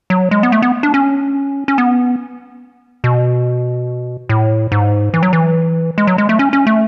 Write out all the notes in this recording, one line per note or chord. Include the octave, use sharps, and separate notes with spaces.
F#3
G#3
B3
A3
B3
D4
C#4
C#4
B3
B2
A2
G#2
E3
F#3
E3
G#3
F#3
G#3
A3
C#4
C#4
A3